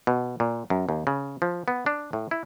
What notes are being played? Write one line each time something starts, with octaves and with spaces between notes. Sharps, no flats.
B2
A#2
F#2
D#2
C#3
F3
B3
D4
A2
E4